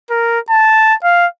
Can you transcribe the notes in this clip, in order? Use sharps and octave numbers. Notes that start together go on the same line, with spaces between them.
A#4
A5
F5